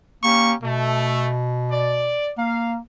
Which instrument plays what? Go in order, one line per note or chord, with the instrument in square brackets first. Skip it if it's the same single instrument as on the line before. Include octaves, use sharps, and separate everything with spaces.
[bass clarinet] A#3 [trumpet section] C#4 G4 C#6
[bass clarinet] B2 [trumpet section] A3
[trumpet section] D5
[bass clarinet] A#3 [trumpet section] F5